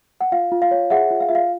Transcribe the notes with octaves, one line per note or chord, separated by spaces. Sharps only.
F#5
F4 F5
F4
F5
C#5
G#4 E5 F#5
F4
F5
F4 E5
F5